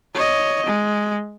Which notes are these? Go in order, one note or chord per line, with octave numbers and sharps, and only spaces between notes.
C#5 D#5
G#3